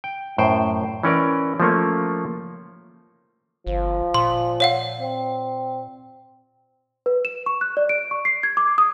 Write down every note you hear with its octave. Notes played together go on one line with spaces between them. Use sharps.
G5
F#2 A2 C5 G5
E3 C#4 A#4 D5
F3 A3 A#3 C#4
G1 F3
A#2 C6
C#5 F5 F#5
C4
B4
E7
C#6
F#6
D5
D7
C#6
C7
G#6
D6
D#6